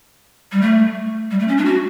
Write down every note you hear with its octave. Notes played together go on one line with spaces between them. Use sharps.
G3
A3
G3
A3
C#4
D4
F#4